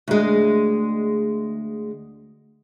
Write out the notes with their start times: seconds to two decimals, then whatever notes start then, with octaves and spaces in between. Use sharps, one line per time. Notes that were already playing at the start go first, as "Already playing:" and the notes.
0.08 D2 G#3